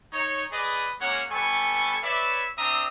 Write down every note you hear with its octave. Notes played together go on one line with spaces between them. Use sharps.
D#4 C#5
G#4 B4 D5 D#5
G#3 A#3 C#4 C#5 F#5
G3 B3 A4 G#5 C#6
B4 C#5 D5 E5
C4 D4 E5 A#5 D#6